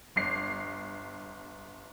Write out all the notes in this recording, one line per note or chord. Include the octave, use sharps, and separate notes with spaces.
G1 C7